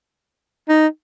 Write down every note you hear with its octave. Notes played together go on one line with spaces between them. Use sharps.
D#4